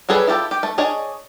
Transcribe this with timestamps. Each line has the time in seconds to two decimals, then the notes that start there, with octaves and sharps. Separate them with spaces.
0.09 G3 C#4 G#4 A4 B4
0.27 E4 F4 G4 A4
0.51 G4
0.63 A3
0.78 D4 G#4 C#5 D#5